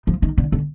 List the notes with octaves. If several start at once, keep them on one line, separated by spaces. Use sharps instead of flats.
F3
D#3
D3
D3